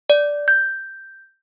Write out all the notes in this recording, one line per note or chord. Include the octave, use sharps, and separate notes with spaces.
D5
G6